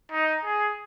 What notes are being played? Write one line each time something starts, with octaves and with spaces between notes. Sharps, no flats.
D#4
G#4